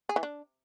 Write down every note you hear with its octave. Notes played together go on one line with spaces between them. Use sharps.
G#4
E3
D4